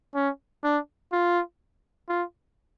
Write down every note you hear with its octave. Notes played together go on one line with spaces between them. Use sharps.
C#4
D4
F4
F4